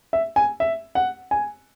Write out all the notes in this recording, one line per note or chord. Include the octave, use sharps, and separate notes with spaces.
E5
G#5
E5
F#5
G#5